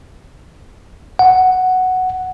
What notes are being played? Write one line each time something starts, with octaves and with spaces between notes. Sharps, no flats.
F#5